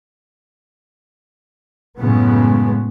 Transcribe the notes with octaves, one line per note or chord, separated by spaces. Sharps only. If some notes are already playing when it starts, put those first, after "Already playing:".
F#2 A2 C#3 G#3 B3